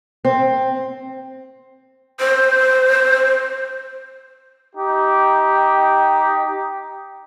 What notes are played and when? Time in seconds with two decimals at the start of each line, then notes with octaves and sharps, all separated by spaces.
0.25 C4
2.20 C5
4.76 D#4 G4